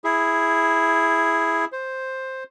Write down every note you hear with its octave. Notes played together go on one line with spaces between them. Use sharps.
E4 G#4
C5